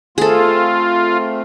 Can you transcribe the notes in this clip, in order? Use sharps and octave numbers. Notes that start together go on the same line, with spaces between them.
A3 C4 F4 G#4 A4